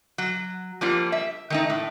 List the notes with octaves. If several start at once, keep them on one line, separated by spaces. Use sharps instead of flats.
F#3
F3 G3 A#3 F4
E5
D#3 A3 D#4
A2